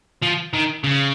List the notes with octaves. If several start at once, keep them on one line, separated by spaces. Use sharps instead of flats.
F3
D#3
C#3